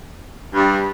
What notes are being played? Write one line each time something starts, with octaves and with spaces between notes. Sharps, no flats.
G2